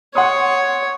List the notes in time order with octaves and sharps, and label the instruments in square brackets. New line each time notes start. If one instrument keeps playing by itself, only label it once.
[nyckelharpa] C#5 [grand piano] F#5 C6 D#6